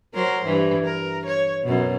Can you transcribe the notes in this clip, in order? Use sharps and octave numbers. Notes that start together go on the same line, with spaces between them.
F#3 A#4 C5
G2 E3
A#4
C#5
F#2 B2